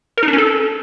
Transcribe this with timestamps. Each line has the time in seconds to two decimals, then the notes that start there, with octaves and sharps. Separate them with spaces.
0.17 A#4
0.23 D#4
0.28 D4
0.33 C#4
0.38 A4